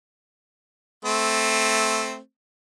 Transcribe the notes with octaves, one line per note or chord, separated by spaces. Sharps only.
A3 C4